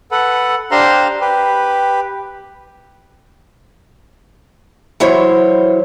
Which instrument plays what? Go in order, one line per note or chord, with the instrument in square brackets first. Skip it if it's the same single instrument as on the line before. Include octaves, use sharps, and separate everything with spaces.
[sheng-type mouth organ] A4 B4 F#5
D4 G4 C5 F5 A#5 C6
G4 B4
[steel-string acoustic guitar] E3 F#3 E4 C5 C#5